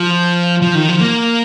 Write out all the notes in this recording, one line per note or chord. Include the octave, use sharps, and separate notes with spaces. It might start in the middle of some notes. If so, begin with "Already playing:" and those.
Already playing: F3
F3
D#3
F3
A#3